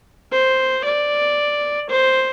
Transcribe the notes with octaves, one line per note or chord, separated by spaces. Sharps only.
C5
D5
C5